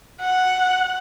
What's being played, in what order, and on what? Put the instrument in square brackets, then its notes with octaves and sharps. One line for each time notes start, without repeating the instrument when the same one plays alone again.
[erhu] F#5